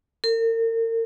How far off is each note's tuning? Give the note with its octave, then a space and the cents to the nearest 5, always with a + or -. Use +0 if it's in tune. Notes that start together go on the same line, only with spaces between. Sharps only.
A#4 -40